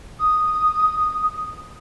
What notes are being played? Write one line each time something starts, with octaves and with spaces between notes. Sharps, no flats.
D#6